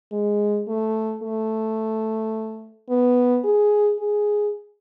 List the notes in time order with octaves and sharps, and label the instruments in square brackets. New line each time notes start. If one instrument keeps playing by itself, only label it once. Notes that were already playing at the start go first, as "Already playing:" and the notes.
[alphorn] G#3
A3
A3
B3
G#4
G#4